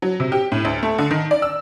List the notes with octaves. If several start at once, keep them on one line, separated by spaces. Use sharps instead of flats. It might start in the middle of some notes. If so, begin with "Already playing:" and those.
F#3
C3
G4
A2
D2
A3
D3
D#3
D5
E6